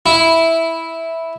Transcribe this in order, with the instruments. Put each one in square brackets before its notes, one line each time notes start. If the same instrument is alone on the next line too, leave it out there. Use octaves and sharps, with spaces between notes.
[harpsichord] E4